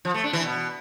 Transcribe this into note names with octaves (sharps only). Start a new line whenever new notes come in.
F3
A3
D4
E3
B2